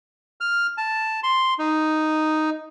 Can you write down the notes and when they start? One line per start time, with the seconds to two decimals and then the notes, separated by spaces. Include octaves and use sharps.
0.41 F6
0.78 A5
1.23 C6
1.59 D#4